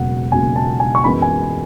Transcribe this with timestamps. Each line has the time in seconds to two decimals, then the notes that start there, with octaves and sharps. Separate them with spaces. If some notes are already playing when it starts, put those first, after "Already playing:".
Already playing: E1 D#2 C#3 F#3 F#5
0.32 E1 D#2 C#3 F#3 G#5
0.56 A5
0.80 G#5
0.95 C#6
1.04 F#2 E3 G#3 B3 B5
1.22 G#5